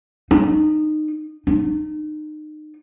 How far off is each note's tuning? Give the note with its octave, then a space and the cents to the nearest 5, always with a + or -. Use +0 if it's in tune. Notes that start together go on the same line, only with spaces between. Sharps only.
D#4 -20
D#4 -30